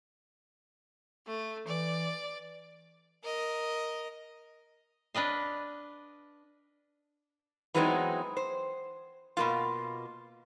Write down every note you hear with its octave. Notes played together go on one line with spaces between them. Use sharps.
A3
E3 D5
A#4 D#5
D4 B4 D#5 F5
E3 F#3 G#3 B3 C4 D#4
C5
B2 A#3 F4